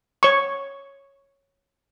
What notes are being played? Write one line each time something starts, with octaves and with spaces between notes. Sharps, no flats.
C#5 C#6